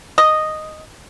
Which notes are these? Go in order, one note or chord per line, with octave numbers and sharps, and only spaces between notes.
D#5